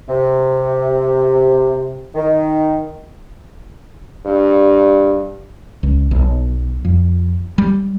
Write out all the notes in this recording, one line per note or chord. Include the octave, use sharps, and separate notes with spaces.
C3
D#3
G2
C#2
B1
F2
G3